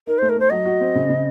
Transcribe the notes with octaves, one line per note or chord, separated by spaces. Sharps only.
D#4 A#4
A3 C5
A#4
A3 C5
F#3 D#5
F#4
C4
C#3
C#3